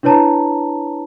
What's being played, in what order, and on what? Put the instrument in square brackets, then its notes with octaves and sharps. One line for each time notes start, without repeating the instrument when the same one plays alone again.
[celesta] D4 E4 B4 C#5 A5 A#5